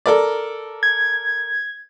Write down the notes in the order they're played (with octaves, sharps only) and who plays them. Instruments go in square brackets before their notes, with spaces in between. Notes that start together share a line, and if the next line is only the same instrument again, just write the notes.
[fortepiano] A4 A#4 D5
[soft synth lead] G#6